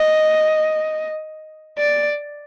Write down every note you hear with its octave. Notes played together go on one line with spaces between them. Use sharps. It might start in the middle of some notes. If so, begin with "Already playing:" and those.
Already playing: D#5
D5